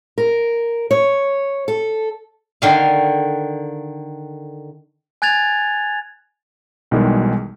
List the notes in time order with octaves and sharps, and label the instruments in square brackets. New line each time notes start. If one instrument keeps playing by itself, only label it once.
[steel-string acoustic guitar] A#4
C#5
A4
[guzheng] D3 D#3 F5
[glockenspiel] G#5 F#6 G#6 A6 F7
[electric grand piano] B1 B2 D#3 E3 G3 G#3